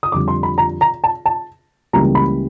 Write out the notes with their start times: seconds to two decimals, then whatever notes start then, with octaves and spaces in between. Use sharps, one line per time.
0.03 D#6
0.12 F2 D3 G3 D6
0.28 C6
0.43 B5
0.58 A#5
0.81 A#5
1.04 A5
1.26 A5
1.93 C#2 C#3 E3 G3 A#3 A#5
2.15 B5